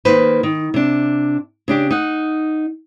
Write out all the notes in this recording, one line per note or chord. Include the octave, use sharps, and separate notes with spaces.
D#3 A#3 B4 C5
D#3
C3 D4
C#3 D4 G4
D#4 F#5